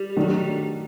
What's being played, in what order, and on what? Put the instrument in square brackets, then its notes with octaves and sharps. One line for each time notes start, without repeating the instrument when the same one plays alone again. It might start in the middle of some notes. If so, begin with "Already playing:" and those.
Already playing: [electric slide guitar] G3
[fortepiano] D#3 F#3 A3 D4